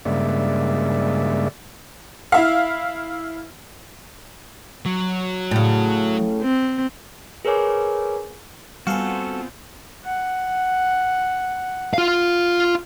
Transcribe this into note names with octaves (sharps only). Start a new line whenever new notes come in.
G2 C#3 G#3 A#3 D5 E5
E4 E5 F5
F#3
A2 C#3
C4
G#4 A#4 B4 C#5 G#5 D6
G3 B3 C4 F4 F#4 A4 F5 G#5
F#5
F4 F5